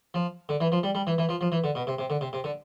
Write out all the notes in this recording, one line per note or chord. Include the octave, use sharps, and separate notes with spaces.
F3
D3
E3
F3
G3
G3
E3
E3
F3
F3
E3
D3
B2
C3
C3
D3
C3
C3
D3